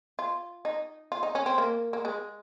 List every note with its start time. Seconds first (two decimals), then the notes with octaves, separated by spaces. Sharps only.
0.19 F4
0.65 D#4
1.12 F4
1.23 D#4
1.35 C#4
1.46 C4
1.58 A#3
1.93 A#3
2.05 G#3